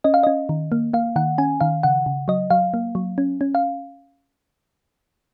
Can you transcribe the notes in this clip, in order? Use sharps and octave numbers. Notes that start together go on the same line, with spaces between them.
C#4 D#5
F5
C#4 D#5
D#3
A#3
A#3 F5
D#3 F#5
C#4 G#5
D#3 F5
C#3 F#5
C#3
F#3 D#5
F#3 F5
A#3
F#3
C#4
C#4
F5